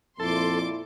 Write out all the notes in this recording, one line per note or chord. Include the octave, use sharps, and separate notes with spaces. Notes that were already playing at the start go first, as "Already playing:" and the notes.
F2 A#2 E4 A4 C6 D6